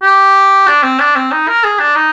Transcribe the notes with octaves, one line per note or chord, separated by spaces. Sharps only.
G4
D4
C4
D4
C4
D#4
A#4
G#4
D4
D#4